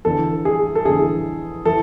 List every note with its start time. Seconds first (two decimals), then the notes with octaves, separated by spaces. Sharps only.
0.05 E2 D3 A4
0.45 G#4
0.75 A4
0.85 E2 D3 G#4
1.65 E3 A4